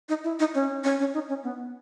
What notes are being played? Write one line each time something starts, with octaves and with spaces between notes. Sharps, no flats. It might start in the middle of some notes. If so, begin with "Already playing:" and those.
D#4
E4
D#4
C#4
C#4
C#4
D#4
C#4
B3